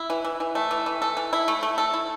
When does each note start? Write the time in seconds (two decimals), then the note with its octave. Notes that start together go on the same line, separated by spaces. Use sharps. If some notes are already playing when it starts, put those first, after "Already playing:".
Already playing: E4
0.10 E3
0.25 E3
0.40 E3
0.55 A3
0.71 E3
0.86 E3
1.02 A4
1.17 E3
1.33 E4
1.48 A3
1.63 A3
1.78 A4
1.94 E4